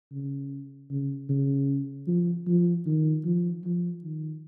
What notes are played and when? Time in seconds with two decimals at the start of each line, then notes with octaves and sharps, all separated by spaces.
0.12 C#3
0.90 C#3
1.29 C#3
2.07 F3
2.47 F3
2.86 D#3
3.24 F3
3.64 F3
4.04 D#3